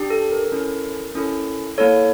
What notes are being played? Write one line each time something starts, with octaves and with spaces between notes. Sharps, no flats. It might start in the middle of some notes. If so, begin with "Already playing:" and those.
Already playing: D4 G4
A4
A#4
C#4 E4 A4
C#4 E4 A4
A#3 E4 A4 C#5